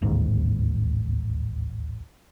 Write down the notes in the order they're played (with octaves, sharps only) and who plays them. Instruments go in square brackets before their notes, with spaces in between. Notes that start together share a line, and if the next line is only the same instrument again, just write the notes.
[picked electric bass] D1 A1 D#2 G#2